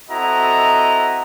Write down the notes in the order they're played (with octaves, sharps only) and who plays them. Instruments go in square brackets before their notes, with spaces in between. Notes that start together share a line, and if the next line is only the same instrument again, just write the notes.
[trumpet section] C4 E4 F#4 A4 D#5 A#5